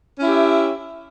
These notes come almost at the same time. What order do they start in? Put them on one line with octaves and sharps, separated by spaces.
C#4 E4 G4 E5